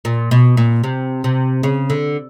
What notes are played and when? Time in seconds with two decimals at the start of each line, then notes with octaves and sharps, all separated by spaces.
0.05 A#2
0.31 B2
0.57 A#2
0.84 C3
1.24 C3
1.63 C#3
1.90 D3